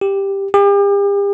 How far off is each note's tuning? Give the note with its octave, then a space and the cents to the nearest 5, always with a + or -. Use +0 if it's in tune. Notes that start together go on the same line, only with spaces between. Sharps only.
G4 +5
G4 +40